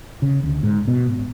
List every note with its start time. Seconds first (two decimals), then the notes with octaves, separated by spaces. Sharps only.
0.22 C#3
0.44 D2
0.63 G#2
0.88 B2
1.08 G#1